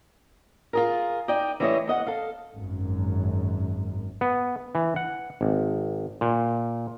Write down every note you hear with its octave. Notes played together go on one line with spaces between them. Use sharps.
F4 G#4 A#4
D#4 D5 D#5 G5
E3 G3 A3 E4 C#5 D#5
E2 D#5 F#5
A4 F5
G#1 F#2
B3
E3
F#5
G#1
A#2